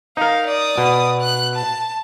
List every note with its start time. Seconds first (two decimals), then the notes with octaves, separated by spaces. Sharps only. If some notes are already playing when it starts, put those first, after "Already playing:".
0.17 D#4 A#4 F5
0.47 D5 D#6
0.78 B2
1.21 F#6
1.55 A5